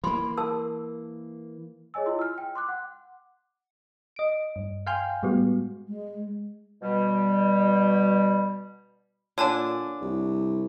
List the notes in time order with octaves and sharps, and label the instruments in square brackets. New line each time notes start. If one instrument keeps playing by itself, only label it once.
[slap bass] E3 A#3 [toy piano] B5 C6
[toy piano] A#4 A5 E6
[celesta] G#4 C#5 D#5 G#5 E6
E4 F4 D#5 C6
E6 F6
G5
C6 D6 F#6
F#5
[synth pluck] D#5 D7
G2
F5 G5 G#5 C6 F6 G6
A2 G3 G#3 B3 F#4
[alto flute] G#3
[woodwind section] B2 G3
[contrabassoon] A#2 [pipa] D3 D4 [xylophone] C#5 G#5 A5
[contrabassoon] C2